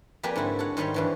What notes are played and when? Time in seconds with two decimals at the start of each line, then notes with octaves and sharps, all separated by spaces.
0.23 F2 A#3 G4 B4 D5 G#5
0.36 G#2 D3 E4 F#4
0.59 A4 C#5 F#5
0.77 G#2 D#3 G3 C#5 C6
0.94 G2 E3 F3